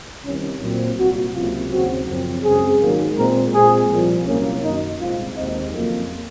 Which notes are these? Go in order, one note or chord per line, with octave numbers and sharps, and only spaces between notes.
C2 C3 D#3 C#4
A#2 F#3 C4
C2 A#2 F#3 A#3 F#4
C#2 C3 F#3 A#3 F4
D#2 C#3 F#3 C4 F#4
F#2 C#3 F3 C4
F#2 C#3 G#3 C4 G#4
G#2 D#3 F#3 A#3
A#2 G#3 C4 A#4
A#2 G#3 C4 G#4
C2 A#2 F3
C2 C3 F#3 A#3 C#4
F#2 D#3 A#3 D#4
C2 A#2 G#3 C4 F4
D#2 D#3 G#3 C4 D#4
F2 C#3 F#3 A#3